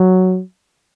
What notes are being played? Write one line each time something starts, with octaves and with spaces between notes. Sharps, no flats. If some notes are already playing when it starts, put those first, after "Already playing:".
Already playing: F#3